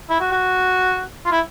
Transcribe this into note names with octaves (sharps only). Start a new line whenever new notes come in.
E4
F#4
F#4
F4
E4